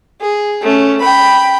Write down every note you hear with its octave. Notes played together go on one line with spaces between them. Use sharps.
G#4
A3 C#4
G5 B5